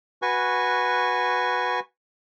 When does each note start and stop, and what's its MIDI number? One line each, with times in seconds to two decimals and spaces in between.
0.22 1.80 66
0.22 1.80 71
0.22 1.80 80
0.22 1.80 85